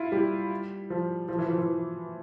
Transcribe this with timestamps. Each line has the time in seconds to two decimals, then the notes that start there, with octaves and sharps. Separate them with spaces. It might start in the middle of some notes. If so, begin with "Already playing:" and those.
Already playing: E4 F4
0.12 G3
0.90 F3
1.29 F3
1.38 E3
1.48 F3
1.58 E3